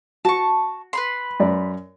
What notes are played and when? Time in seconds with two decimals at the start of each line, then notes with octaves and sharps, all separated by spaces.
0.25 F#4 A5 C#6
0.93 B4 B5 C6
1.40 F#2 D5